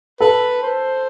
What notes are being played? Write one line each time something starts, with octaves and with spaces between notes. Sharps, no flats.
A4 B4
C5